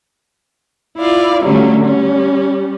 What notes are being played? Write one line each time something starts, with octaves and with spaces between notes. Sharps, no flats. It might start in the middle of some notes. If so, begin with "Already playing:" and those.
E4 F4 D5 F5
D3 F#3 G3 A3 C#4
G3 C#4